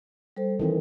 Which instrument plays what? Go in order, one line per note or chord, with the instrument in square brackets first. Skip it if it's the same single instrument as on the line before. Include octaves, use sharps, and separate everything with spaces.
[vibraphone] G3 A4 C5
[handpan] D#3 E3 C4 [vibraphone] A4